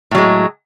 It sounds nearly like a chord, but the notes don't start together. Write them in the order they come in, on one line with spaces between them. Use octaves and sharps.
A2 F#3 G#3